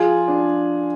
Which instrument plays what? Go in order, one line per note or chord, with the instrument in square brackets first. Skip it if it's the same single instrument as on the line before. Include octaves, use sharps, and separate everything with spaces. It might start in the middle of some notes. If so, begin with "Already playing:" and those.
Already playing: [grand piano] F3 F4 G#4
D4